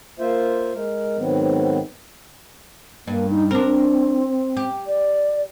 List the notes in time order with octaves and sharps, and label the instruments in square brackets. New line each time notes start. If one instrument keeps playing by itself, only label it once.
[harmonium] A#3 F4 C5 E5
G#3 A#4
G#2 D#3 F#3 B3 C4
[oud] G2 [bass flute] A#3
[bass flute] D#4
[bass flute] C4 [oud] D4 A#4
[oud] G4
[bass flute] D5